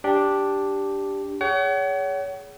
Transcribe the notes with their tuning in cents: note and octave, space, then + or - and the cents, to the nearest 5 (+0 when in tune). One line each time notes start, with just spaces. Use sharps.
D4 -5 G4 +0
G#4 +0 C#5 +30 F#5 +40